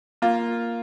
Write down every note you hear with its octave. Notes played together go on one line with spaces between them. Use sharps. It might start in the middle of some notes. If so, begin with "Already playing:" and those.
A#3 F4